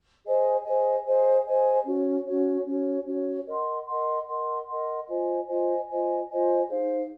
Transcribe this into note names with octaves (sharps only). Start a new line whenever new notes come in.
G#4 C5 D#5 G#5
G#4 C5 D#5 G#5
G#4 C5 D#5 G#5
G#4 C5 D#5 G#5
C#4 F#4 C#5
C#4 F#4 C#5
C#4 F#4 C#5
C#4 F#4 C#5
A#4 D#5 F#5 C6
A#4 D#5 F#5 C6
A#4 D#5 F#5 C6
A#4 D#5 F#5 C6
F4 C5 D#5 G#5
F4 C5 D#5 G#5
F4 C5 D#5 G#5
F4 C5 D#5 G#5
D#4 G#4 C5 F5